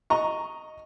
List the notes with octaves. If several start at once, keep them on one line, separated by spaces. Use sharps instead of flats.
D#5 A#5 C#6